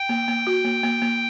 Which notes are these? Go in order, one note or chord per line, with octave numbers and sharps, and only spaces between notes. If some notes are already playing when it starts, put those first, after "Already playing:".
Already playing: G5
A#3
A#3
F#4
A#3
A#3
A#3